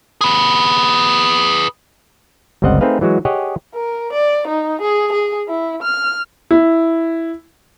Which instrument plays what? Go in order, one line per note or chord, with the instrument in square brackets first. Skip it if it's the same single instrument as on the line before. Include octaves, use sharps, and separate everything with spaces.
[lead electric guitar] G#4 B4
[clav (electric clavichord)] G1 C#2 G3 C4 D#5 F#5
A3 C4 D#4 G#4 B4 F5
E3 F#3 G#3 F#4
G4 G#4 C#5 D#5 F#5
[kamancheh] A#4
D5
D#4
G#4
G#4
E4
F6
[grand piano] E4